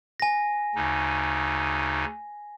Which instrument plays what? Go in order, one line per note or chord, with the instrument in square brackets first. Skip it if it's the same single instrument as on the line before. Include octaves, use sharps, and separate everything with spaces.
[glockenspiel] G#5 A#6
[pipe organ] D2 C#3 D#4